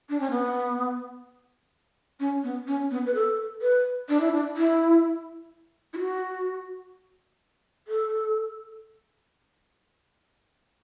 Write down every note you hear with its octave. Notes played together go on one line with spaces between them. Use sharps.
D4
C#4
B3
C#4
B3
C#4
B3
B4
A4
B4
D4
E4
D4
E4
E4
F#4
A4